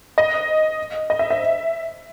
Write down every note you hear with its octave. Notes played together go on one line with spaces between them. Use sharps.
D#5
D#5
E5
E5